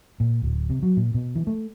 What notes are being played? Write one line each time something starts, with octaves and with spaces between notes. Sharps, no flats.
A#2
D1
C3
F#3
A#2
B2
E3
A3